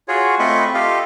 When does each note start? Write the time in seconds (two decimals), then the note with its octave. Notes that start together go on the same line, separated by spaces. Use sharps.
0.08 F4 F#4 G#4 C#5
0.39 A3 C4 F4 D#5 B5 C#6
0.74 F4 G4 A4 D#5 F5